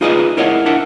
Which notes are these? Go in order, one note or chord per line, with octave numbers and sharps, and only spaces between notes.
D#4 F4 G#4 B4 D5 D#5
E4 A#4 C#5 D#5 F5 F#5
D4 E4 A#4 E5 F#5